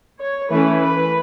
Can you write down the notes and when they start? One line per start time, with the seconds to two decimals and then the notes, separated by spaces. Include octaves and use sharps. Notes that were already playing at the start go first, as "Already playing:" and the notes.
0.21 C#5
0.51 E3 A3 C#4 B4
0.81 B4